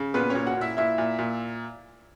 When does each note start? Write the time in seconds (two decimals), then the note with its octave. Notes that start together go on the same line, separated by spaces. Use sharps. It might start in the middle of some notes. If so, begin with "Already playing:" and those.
Already playing: C#3
0.14 A#2 B3 B4
0.30 C#4 C#5
0.35 A#2
0.47 F#4 F#5
0.57 A#2 E4 E5
0.77 A#2 E4 E5
0.98 A#2
1.19 A#2